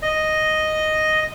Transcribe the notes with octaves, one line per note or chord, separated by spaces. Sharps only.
D#5